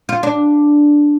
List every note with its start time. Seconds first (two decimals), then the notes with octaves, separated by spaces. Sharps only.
0.09 F4
0.23 D4